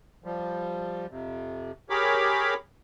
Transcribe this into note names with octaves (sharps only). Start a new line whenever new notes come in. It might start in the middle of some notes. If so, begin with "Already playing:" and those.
F3 G3
F2 C3
G4 G#4 A#4 C#5 B5 D6